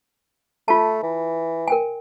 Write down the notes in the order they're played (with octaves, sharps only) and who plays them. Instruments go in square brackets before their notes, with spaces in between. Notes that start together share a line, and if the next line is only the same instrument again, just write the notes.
[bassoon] A3 [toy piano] F4 A5
[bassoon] E3
[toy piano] A#4 G5 G#5